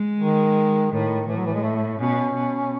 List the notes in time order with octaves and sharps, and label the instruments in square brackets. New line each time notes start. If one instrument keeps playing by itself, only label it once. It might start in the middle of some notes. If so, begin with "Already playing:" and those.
Already playing: [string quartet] G#3
[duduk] D#3
[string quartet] A2 [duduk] D#3
[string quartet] A2 [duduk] E3
[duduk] F#3
E3
G#3
A3
A3
A3
[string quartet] B2 [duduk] C#4
[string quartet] B2